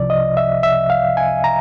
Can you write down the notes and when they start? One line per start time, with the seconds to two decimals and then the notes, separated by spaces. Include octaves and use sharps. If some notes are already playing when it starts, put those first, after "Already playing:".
Already playing: C2 C3 F3 D5
0.10 D#5
0.37 E5
0.63 E5
0.90 F5
1.17 G#5
1.44 A#5